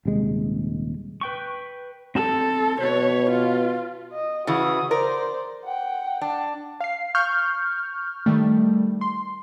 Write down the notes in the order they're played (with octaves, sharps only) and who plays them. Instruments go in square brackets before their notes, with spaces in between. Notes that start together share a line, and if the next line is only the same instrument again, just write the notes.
[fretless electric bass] D#1 C3 G#3
[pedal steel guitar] B4 G5 C#6
[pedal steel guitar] C4 A5 E6 [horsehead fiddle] A4
[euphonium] B2 [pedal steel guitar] B4 [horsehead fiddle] C#5
[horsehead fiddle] F4
[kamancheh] D#5
[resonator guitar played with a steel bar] C#3 E3 [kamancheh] F#4 D#6
[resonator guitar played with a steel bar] A#4 [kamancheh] C5 D5
[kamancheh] F#5 G5
[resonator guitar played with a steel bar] D4
[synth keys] F5 C7
C#6 F6 G6
D#3 G3 A3
C6